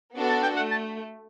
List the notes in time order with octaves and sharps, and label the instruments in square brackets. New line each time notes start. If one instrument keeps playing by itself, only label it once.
[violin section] B3 D4 F#4 A4
[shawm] A5
G5
[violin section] A3 [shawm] F#5
[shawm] A5